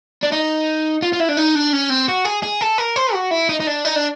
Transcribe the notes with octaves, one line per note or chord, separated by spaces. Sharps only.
D4
D#4
F4
F4
E4
D4
D#4
D4
C#4
C4
F#4
G#4
G#4
A4
A#4
C5
F#4
E4
D#4
D#4
D4
D#4
D4